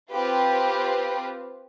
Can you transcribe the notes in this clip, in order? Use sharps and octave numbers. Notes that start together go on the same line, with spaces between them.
C4 F4 G4 B4